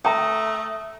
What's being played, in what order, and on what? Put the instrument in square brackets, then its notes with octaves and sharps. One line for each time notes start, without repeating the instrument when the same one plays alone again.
[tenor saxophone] A3 [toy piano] G5 A#5 [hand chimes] D#6 A#6